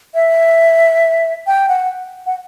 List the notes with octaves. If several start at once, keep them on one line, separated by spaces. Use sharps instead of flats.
E5
G5
F#5
F#5